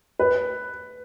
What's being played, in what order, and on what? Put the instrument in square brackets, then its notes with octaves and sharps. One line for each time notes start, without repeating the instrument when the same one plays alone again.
[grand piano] B4